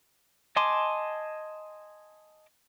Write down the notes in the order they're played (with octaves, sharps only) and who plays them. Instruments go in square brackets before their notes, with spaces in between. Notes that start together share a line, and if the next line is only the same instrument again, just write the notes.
[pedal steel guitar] D#5 G#5 A5 C6 D6